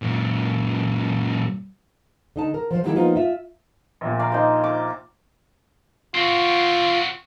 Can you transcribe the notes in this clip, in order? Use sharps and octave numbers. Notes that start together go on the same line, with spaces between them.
F#2 A#2
D3 D#4 A5
A#4
F3 C5
D#3 F#3 G#3 A#3 E4 G4
F3 A#3 B3 D#4 F4
F4 E5
A#1 A#2
D5 F5 A#5
D#4 C5
D6
C4 F4 F#4